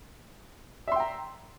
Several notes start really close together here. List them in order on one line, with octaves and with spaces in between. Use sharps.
E5 C6 G5 A#5